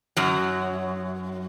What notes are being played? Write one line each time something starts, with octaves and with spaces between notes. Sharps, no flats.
F#2 F#3